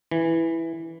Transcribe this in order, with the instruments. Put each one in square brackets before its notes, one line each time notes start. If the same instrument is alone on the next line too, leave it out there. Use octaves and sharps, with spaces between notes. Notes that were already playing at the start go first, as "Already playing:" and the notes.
[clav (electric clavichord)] E3